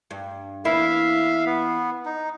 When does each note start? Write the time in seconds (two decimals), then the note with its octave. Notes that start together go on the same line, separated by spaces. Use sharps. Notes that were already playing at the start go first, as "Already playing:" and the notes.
0.11 G2
0.65 E2 A#3 E4 E5 F5
1.46 B3
2.06 D#4